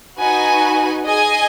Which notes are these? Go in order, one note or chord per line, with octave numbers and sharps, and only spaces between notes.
D#4 F#4 B4 G#5
G#4 D#5 G#5